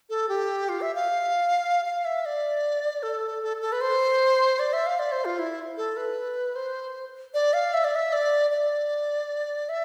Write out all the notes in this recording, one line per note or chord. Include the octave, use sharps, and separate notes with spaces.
A4
G4
F4
E5
F5
F5
E5
D5
A4
A4
A4
B4
C5
D5
E5
F5
D5
C5
F4
E4
A4
B4
C5
D5
F5
E5
D5
E5
D5
D5
E5